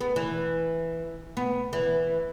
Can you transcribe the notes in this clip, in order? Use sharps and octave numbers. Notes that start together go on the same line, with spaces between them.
B3
E3
B3
E3